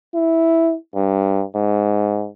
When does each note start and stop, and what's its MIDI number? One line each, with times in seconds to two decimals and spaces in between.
0.14 0.75 64
0.95 1.44 43
1.55 2.28 44